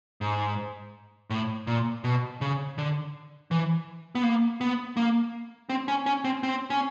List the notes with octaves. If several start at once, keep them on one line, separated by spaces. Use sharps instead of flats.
G#2
A2
A#2
B2
C#3
D3
E3
B3
A#3
B3
A#3
C4
C#4
C#4
C4
C4
C#4